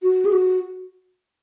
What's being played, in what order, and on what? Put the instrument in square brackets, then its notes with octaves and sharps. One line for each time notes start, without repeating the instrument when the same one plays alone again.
[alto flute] F#4
G#4
F#4